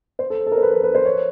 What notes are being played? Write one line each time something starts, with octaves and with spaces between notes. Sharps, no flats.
C5
A4
A4
A#4
C5
B4
B4
B4
C5
C#5